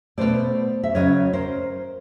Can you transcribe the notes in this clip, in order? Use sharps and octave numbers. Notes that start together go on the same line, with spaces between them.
B2 F#3 A3 C5 D5
E5
F#2 C#3 F#3 C#5 D#5
A#4 C5